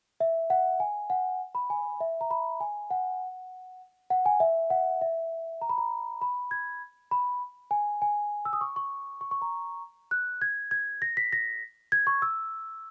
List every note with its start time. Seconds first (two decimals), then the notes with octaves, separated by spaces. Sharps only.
0.20 E5
0.50 F#5
0.80 G#5
1.10 F#5
1.55 B5
1.70 G#5
2.01 E5
2.21 A#5
2.31 B5
2.61 G#5
2.90 F#5
4.10 F#5
4.26 G#5
4.40 E5
4.70 F#5
5.01 E5
5.61 A#5
5.69 B5
5.78 A#5
6.22 B5
6.51 G#6
7.11 B5
7.71 G#5
8.02 G#5
8.45 E6
8.53 D#6
8.61 C#6
8.76 C#6
9.21 C#6
9.31 C#6
9.42 A#5
10.11 F#6
10.42 G#6
10.71 G#6
11.02 A#6
11.17 B6
11.33 A#6
11.92 G#6
12.07 C#6
12.22 E6